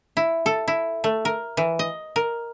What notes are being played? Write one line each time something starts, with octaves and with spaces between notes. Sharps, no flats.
E4
A4
E4
A3
A#4
E3
D#5
A#4